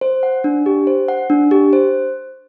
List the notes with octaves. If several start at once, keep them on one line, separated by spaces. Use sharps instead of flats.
C5
F#5
D4
G4
C5
F#5
D4
G4
C5